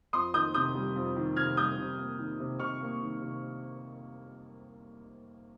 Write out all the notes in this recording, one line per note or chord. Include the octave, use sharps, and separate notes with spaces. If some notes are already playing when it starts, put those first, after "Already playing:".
F2 C6 D#6
D#3 D#6 G6
C3 D#6 G6
G3
F2
D#3
C3 F6 G#6
G3 D#6 G6
C3
A#3
D#3
C3
C3 C#6 F6
A#3
D#3
C3